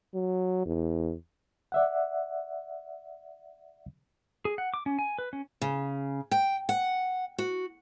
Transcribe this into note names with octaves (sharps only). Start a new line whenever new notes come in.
F#3
E2
D5 E5 F#5
G#4
F#5
D6
C#4
G#5
B4
C#4
C#3
G5
F#5
F#4